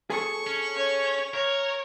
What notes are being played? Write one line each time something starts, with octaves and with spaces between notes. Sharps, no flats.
G#4 A4 C#6
C#4
C#5
A#4 C#5